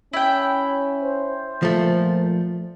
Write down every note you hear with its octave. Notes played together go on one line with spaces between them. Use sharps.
C#4 E4 G5
C5
A#2 F3 A3